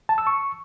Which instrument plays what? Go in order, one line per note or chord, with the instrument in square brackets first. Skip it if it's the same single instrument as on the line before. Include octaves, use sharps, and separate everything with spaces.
[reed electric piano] A5
E6
C#6